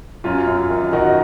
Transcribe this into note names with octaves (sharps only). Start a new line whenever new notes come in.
F#2 C#4 F4
F#2
D#3
D#3 D#4 F#4